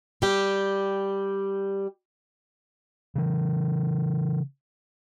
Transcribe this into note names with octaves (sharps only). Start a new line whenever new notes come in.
G3 G4
C#3 E3